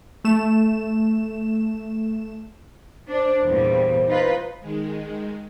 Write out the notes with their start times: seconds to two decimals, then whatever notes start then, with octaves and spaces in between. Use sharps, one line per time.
0.24 A3 E7
3.08 D4 C5
3.44 E2 A#2 G3
4.07 D#4 F4 B4
4.60 D#3 G#3